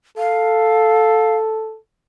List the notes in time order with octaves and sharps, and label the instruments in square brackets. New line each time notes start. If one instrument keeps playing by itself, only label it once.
[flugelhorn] A4 [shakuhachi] F5